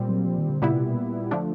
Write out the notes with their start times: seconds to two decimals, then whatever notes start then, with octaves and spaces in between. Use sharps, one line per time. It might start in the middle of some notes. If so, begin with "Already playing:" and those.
Already playing: A#2 G3 C4
0.09 F#3
0.26 F3
0.38 D#3
0.50 D3
0.61 A#2 C#3 G3 B3 E4
0.73 C3
0.85 B2
1.31 D3 F3 A3 D4